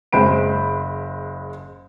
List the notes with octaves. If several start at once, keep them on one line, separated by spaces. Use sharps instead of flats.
F#1 G#3 C5 B5 D7